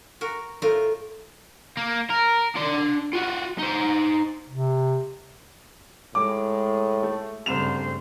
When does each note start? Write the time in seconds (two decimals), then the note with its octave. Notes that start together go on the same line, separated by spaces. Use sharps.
0.21 F#4 A#4
0.62 A2 A3 F4 A#4
1.77 A#3
2.10 A#4
2.55 D4 C6
3.13 F4 F#4
3.59 D#4 C5
4.50 C3
6.15 A2 G#3 D6
7.03 A3
7.46 C2 G2 C#3 A3 C5 E7 F7